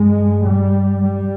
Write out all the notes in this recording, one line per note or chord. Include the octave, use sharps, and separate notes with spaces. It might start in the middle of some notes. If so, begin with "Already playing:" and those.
Already playing: G2 G#3
G3
G3